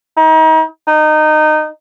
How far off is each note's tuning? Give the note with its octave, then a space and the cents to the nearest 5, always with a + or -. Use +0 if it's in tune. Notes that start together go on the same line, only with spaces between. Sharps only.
D#4 +35
D#4 -20